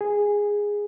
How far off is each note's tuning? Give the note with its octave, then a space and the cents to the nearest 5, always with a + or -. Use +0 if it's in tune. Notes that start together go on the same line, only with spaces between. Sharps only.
G#4 -10